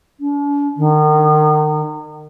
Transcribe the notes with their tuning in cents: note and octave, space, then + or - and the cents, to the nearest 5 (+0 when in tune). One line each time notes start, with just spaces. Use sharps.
D4 -45
D#3 -35